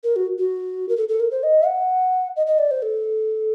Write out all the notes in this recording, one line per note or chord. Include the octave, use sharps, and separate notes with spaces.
A#4
F#4
F#4
A#4
A4
A4
A#4
C5
D#5
F#5
D#5
D#5
D5
C5
A4